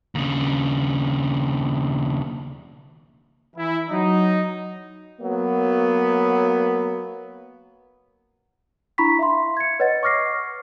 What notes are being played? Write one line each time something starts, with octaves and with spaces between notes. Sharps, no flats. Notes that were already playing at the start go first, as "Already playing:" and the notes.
D#2 C#3
E3 E4
F#3 D#4
F#3 A#3 B3
D4 E4 A#5 B5 C#6 B6
E5 F5 C6
G#6 C#7
B4 C#5 D#5 F#5 A6
C#6 D6 F6 A#6 C7